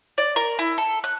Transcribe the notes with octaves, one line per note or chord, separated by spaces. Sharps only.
D5
A#4
E4
A4
F#6